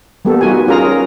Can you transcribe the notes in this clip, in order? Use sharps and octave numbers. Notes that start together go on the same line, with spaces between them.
G3 A#3 B3 G4 A4
D#4 F4 F#4 B4 G#5
C#4 F4 G#4 A#4 G#5 A#5
G#4 A#4